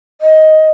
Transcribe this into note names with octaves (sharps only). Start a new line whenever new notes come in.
D#5